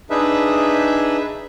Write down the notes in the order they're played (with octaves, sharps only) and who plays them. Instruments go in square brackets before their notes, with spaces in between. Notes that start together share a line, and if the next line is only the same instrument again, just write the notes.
[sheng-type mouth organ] D4 D#4 G#4 B4 E5